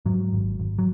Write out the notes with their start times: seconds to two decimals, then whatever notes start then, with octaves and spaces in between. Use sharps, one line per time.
0.06 G#2 F#3
0.33 G#1
0.59 G#1
0.79 F#3